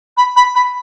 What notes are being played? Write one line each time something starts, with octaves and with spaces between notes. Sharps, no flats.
B5
B5
B5